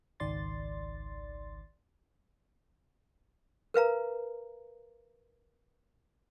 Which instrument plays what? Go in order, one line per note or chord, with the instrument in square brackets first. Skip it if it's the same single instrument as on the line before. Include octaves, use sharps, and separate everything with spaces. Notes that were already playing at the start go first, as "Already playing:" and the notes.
[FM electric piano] G#1 C#2 D#3 D5 C6 A6
[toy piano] A#4 B4 F5 A#5